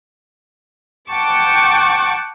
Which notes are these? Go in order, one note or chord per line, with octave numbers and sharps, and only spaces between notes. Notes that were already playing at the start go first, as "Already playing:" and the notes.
F#5 G5 A5 C#6 D6